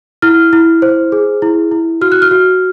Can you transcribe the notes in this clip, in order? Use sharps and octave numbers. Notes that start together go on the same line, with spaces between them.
E4 F6
E4
C5
G#4
E4
E4
F#4 F6
F#6
F6
F#4